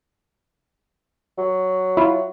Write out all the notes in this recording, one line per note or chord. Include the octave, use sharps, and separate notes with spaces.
F#3
E4 F4